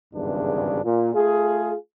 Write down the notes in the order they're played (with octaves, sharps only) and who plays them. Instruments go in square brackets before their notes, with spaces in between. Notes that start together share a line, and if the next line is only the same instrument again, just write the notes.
[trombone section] G#1 E2 G2 C#3 D4
A#2
A3 F4 G#4